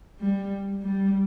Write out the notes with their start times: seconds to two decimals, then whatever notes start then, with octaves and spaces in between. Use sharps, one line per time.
0.20 G3
0.82 G3